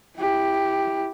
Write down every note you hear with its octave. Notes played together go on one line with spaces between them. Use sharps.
E4 G4